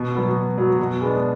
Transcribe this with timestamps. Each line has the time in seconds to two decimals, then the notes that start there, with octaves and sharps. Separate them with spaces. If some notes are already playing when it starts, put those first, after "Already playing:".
Already playing: B2
0.15 F#3 B3 F#4
0.36 B2
0.58 F#3 B3 F#4
0.79 B2
1.01 G#3 B3 D4